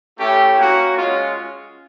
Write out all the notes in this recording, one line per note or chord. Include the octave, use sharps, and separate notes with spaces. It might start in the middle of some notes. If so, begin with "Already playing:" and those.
A3 C#4 E4 G4
A#3 C#4 F#4
G#3 C#4 F4